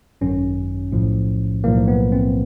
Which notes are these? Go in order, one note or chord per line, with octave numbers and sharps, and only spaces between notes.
G#1 F#2 D#3 C#4
B1 A2 F3
B1 A2 F3 A#3
B3
C4